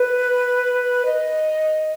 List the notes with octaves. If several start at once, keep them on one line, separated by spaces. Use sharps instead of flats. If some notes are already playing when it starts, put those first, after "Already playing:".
Already playing: B4
D#5